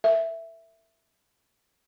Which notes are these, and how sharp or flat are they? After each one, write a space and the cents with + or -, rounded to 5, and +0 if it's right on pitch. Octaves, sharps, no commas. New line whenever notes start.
A#4 -25 E5 +5